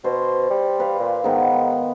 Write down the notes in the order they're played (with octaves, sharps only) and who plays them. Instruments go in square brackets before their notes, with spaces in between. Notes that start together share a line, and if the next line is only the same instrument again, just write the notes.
[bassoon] B2 [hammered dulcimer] C5
[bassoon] G3
[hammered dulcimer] B4 F5
[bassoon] A#2
[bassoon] G#2 [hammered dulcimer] D#3 B3